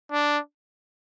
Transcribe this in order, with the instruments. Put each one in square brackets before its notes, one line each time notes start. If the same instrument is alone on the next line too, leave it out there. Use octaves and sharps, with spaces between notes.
[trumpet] D4